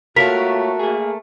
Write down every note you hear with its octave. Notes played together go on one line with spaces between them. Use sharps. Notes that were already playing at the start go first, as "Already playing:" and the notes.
A#2 A3 F4 F#4 A#4 C#5 B6
A#3 G#4